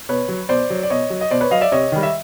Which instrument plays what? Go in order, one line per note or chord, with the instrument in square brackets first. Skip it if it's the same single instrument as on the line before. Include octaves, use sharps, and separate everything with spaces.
[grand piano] B2 B4 C#5
F#3
B2 C5 D5
F#3
D5
B2 C#5 D#5
F#3
D#5
B2 C5 D5
B4 C#5
F#3 D#5 F5
D5 E5
C3 C#5 D#5
D#3 G3
E5